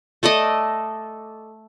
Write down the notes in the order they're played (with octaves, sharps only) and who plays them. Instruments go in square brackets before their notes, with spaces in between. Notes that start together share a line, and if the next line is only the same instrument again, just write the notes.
[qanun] A3 A4 D5 D#5